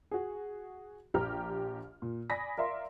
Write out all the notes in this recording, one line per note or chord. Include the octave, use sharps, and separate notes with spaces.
F#4 G#4
A#1 G4 A#5 F6
A#2
D5 G#5 B5 D#6 A#6 B6
A#4 D5 E5 F5 C6